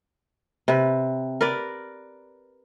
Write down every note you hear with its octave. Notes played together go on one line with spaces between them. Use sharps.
C3 B4
A#4 B4 D5